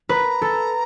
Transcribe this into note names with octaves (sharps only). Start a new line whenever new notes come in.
B4 A#5
A4